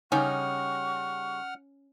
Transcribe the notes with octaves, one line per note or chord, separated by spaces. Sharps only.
C#3 G3 C#4 D#4 F#5 C#6 F6